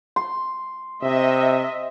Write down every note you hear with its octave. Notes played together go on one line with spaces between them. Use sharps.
C6
C3 D#5 E5